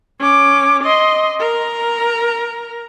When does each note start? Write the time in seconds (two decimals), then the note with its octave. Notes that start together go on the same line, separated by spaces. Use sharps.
0.19 C#4 D6
0.84 D#5 C6
1.39 A#4 A#5